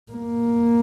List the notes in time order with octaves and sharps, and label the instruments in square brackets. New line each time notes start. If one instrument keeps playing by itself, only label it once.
[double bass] A#3